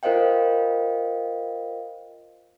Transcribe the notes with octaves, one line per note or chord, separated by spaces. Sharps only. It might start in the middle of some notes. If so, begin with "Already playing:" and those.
F4 A#4 C5 D#5 F5 G5